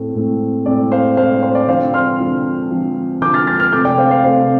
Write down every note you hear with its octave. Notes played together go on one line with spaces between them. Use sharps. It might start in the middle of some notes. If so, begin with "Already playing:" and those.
Already playing: A2 A3 C4
A2 A3 C4
A2 A3 C4 D5
C5 F5
A2 A3 C4 C5 F5
D5
C5
D5
D3 F3 C4 C5 F5
C6 F6
D3 F3 C4
D3 F3 C4
D3 F3 C4 D6 G6
F6 A6
F6 A6
F6 A6
C3 A3 C4 D6 G6
D5 G5
C5 F5
C5 F5
C3 A3 C4 C5 F5